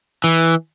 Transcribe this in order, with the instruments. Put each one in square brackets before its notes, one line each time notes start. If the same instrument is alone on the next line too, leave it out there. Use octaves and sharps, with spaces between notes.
[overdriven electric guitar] E3